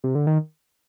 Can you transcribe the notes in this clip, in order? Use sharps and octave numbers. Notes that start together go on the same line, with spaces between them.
C3
D3
D#3